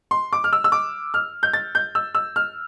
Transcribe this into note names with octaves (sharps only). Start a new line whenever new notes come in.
C6
D6
F6
E6
E6
D6
F6
G6
A6
G6
E6
E6
F6